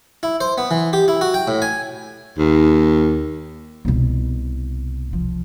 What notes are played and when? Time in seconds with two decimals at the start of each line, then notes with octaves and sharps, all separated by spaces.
0.23 E4
0.41 C5
0.58 B3
0.71 E3
0.93 G4
1.08 E4
1.21 F#4
1.34 G5
1.48 A2
1.62 G#5
2.38 D#2
3.85 C2 B2
5.13 F3